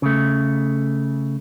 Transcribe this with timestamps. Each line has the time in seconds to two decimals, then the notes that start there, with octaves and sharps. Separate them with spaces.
0.02 C#3 A3